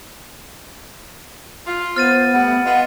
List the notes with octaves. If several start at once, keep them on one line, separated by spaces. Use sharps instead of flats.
F4
B3 C5 F6 A6 D#7
G3 A3 F#5
B3 F4 D#5